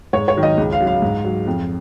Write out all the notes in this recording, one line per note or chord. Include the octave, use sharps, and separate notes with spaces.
G#2 C#5
C#5
D#3 F#3
D#5
C#2
F5
C#3 F#3
F5
G#2
F#3
F2